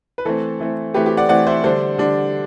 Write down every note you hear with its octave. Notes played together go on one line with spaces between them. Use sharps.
B4
E3 A3 C4 A4
E3 A3 C4
E3 A3 C4 G4 B4
G4
D5 F#5
E3 A3 C4 D5 F#5
C5 E5
D3 G3 D4 A4 C5
D3 G3 D4